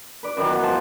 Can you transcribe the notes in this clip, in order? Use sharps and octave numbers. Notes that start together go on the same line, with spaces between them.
B4 D5
F#2 D#3 E3
B3
F3 G#3 C5 A5